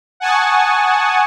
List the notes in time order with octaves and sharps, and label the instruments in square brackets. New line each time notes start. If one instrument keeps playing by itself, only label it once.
[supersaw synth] F#5 G#5 A5 C#6 D#6